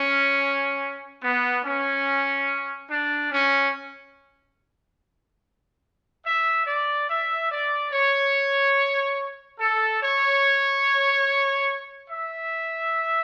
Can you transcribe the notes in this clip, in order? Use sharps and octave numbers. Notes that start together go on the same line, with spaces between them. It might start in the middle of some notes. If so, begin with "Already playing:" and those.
Already playing: C#4
B3
C#4
D4
C#4
E5
D5
E5
D5
C#5
A4
C#5
E5